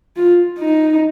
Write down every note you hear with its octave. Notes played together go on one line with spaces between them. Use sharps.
F4
D#4